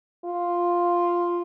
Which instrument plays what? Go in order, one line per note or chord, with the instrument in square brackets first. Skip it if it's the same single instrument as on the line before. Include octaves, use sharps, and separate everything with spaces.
[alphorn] F4